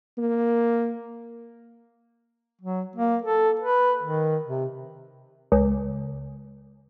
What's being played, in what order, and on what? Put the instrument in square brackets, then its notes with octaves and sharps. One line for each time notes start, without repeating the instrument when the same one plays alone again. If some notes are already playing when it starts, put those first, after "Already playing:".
[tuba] A#3
[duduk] F#3
A#3
A4
B4
D#3
C3
[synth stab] C#2